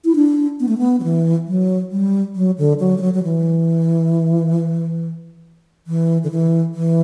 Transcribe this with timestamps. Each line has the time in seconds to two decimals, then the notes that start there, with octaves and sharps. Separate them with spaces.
0.05 E4
0.16 D4
0.60 B3
0.68 A3
0.78 B3
1.00 F#3
1.03 E3
1.48 F#3
1.91 G3
2.36 F#3
2.58 D3
2.80 F#3
2.98 G3
3.01 F#3
3.14 F#3
3.23 E3
5.87 E3
6.23 D3
6.31 E3
6.74 E3